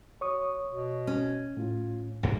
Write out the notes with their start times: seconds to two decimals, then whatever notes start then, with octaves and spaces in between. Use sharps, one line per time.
0.21 F#4 C#5 C#6 D#6
0.72 B2
1.07 C#4
1.57 A2 F4
2.23 C#2 G2 A#3 F#4